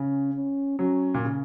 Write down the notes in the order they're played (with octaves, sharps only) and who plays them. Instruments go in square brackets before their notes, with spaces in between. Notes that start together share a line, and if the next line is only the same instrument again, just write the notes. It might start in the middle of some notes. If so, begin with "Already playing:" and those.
Already playing: [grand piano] C#3 [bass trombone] C#4
[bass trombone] C#4
[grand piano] F#3 [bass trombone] C#4
[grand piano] A#2
C#3